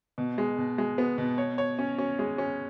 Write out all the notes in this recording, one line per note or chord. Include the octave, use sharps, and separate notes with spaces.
B2
G#3
B2
G#3
B3
B2
C#5
C#5
C#4
C#4
G#3
C#4